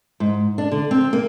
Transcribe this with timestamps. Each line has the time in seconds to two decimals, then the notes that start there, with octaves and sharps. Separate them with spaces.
0.20 G#2
0.58 D4
0.72 D3
0.91 C4
1.13 A#3